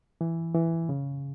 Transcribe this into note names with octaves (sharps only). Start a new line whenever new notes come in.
E3
E3
C#3